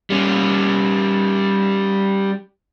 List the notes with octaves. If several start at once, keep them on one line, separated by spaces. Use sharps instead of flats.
G3 C#4